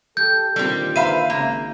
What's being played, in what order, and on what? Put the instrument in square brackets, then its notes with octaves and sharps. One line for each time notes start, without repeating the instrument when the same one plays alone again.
[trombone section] G4 A4 [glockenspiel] G6
[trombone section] A#2 D3 D#3 [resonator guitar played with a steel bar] G3 C4
[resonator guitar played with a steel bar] B4 C5 [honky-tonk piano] E5 F5 B5 [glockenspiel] D#7
[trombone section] G#1 C#3 [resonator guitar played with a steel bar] A#3